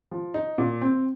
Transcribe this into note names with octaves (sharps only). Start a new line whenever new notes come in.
F3
D#4
A#2
C4